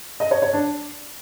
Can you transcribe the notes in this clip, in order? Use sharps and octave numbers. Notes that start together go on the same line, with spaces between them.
D#5
C#5
C#5
D4